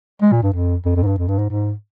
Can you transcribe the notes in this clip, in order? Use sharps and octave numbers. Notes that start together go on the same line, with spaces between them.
G#3
A#2
G2
F2
F2
F2
G#2
G2
F2
G2
G#2
G#2